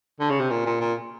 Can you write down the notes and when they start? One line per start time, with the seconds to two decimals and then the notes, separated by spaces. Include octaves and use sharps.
0.20 D3
0.30 C#3
0.40 C3
0.51 A#2
0.66 A#2
0.80 A#2